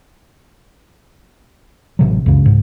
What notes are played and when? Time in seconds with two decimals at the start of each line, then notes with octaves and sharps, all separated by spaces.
1.99 A1 C3 F#3
2.26 C#2 F#2 C#3
2.46 G#2